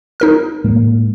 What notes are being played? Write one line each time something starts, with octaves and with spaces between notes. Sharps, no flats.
D#4 A#4 F6
A2 G#3 A#3